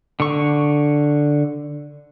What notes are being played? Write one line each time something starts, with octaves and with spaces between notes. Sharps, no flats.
D3 C#6